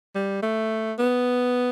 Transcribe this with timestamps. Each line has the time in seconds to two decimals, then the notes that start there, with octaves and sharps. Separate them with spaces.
0.15 G3
0.42 A3
0.98 B3